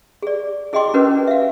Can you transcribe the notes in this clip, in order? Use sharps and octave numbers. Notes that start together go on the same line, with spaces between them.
G#4 D5
E4 G#4 D#5 G5 C6 D6
C#4 D4 E4 F#4 A#4 B4
E5 F5